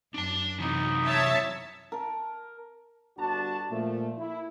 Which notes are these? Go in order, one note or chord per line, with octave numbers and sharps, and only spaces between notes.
F#2 D4 A5
C3 E3 D#4
C#5 E5 A5
A#4 A5
G1 D4 F#4 A5
A#2 F3 A3
E4